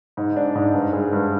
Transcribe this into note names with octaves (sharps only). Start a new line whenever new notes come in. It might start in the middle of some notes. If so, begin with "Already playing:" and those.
G#2
D4
G#2
G2
G#3
G2